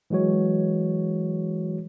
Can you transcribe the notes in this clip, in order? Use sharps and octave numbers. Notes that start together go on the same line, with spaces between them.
E3 F#3 G#3 F#4 C#5